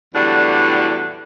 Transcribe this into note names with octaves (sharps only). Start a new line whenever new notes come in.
E2 A2 D3 F#3 G3 D4